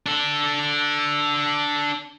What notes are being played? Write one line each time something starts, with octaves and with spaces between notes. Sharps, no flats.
D4 A4